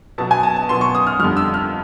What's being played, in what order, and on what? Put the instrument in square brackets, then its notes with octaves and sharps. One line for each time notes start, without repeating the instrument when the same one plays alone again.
[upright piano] B2 F#3 B3 A5
G#5
A5
A5
B2 F#3 B3 C6
C#6
D#6
F6
F2 D3 G3 F6
E6
F6